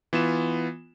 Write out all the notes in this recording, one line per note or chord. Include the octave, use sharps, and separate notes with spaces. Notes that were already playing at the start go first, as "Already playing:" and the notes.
E3 B3 F4 E7